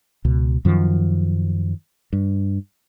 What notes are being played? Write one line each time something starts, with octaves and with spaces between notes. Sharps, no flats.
C#2 B2
F#2 D#3 F3
G2